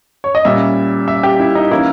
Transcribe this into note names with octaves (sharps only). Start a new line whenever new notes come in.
C#5
D#5
A#2 G3 C#4 E5
E5
G4
E4
D#4
E3 A#3 C#4 E4